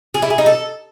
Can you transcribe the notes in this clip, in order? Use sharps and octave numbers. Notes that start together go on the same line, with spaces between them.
G#4
E4
G#4
D#4
A4